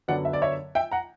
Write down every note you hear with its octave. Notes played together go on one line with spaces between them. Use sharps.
F#2 D3 F#3 B3 D5 F#5
E5
D5
C#5 E5
E5 G5
F#5 A#5